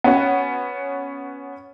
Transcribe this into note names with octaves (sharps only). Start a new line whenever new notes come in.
B3 C#4 F#4